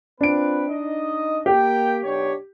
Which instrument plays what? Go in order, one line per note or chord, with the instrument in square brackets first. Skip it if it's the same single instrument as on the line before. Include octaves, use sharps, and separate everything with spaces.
[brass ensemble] C4 F4 B4 [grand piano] D4 D7
[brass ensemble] D#4 D#5
[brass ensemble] A#3 G5 [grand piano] G4
[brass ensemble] B1 D4 C#5